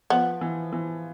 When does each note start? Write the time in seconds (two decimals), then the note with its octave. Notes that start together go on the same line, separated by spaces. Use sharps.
0.10 F3 B3
0.41 E3
0.73 E3